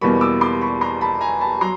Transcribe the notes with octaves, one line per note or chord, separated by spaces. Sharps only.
E2 B2 G3 A#3 B5 C#6
D6 E6
C6 D6
B5 C#6
A#5 C6
A5 B5
G#5 A#5
A5 B5
F#3 A#5 C6